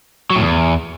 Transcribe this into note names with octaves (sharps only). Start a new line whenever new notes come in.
F#3
A2
E2